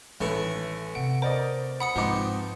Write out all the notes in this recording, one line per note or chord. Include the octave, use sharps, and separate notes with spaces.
A1 D#3 A3 B3 E5
C3 F#5 D7
A#4 C5 D5 D#5
F#5 B5 D#6 C#7
G#2 F3 B3 C4 D#4 D6